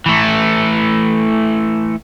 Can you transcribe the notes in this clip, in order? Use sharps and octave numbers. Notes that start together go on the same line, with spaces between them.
E3 A3